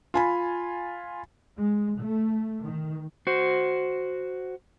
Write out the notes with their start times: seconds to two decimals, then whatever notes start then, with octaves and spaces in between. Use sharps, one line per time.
0.14 F4 G#5 B5
1.59 G#3
1.99 A3
2.63 D#3
3.27 F#4 C5